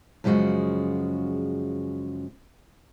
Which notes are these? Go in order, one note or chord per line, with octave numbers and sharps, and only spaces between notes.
F#2 C#3 F3 G#3 F#4